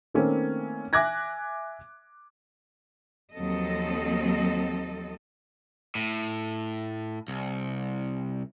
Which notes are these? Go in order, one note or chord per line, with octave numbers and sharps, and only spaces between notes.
D#3 A3 A#3 C4 C#4
E5 G#5 D6 F#6 G#6 A#6
D#2 F3 F#3 C4 A4 D#5
A2
C2